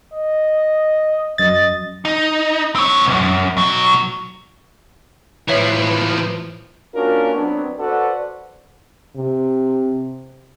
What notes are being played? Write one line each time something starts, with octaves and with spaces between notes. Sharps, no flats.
D#5
F#2 D#5 A6
D#4
C4 C#5
B1 F#2
B2 F#3
A2 E3 F3 B4 C#5 E5
A#3 C#4 D4 F4 F#4 A#4
F#3 B3 C4 D4
F#4 A4 B4 C5 D5 F#5
C3